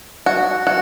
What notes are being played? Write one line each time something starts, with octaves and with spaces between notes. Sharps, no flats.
F#4
F#4